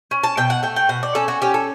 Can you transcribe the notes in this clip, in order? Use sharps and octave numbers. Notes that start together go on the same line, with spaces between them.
C#4
A5
B2 G5
F#5
A3 G5
G5
B2 F#5
D5
C#4 A4
F#4
C#4 G4
A4